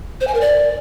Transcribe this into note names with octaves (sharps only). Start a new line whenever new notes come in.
C5
G#5
A#4
D5